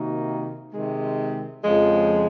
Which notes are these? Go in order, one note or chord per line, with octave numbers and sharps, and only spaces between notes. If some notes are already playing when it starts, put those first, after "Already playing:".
Already playing: C3 D#3 A#3 D#4 F#4
C3 D#3 G#3
F2 C#3 F3 G#3